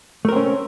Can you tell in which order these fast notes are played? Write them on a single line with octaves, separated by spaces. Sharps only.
A3 A#4 C4 C#4